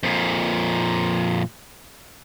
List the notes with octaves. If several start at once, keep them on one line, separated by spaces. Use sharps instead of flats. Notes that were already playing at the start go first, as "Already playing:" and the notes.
F2 A#2